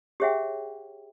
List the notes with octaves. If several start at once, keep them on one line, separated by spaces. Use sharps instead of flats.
G4 G#4 C#5 E5 F#5 G5